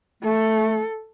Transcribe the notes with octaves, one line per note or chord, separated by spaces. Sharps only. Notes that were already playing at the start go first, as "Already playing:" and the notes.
A3 A4